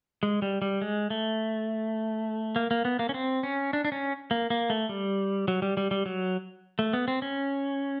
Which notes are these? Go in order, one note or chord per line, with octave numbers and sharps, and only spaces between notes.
G#3
G3
G3
G#3
A3
A#3
A#3
B3
A#3
C#4
C4
C#4
D4
D4
C#4
A#3
A#3
A3
G3
F#3
G3
G3
G3
F#3
A3
B3
C4
C#4